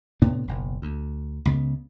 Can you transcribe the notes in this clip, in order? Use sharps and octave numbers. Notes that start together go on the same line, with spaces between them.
A2 C3 B3 D4
F#1 B1
D2
C#2 C#3 B3